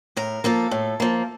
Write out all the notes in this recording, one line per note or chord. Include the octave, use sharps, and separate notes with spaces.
A2 A#4
F3 A#3 A4
A2
F3 A#3